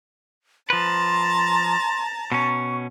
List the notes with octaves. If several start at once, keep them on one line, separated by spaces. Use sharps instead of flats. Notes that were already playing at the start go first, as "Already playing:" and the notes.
F3 B4 A5 A#5 C6
B2 C#4 C#6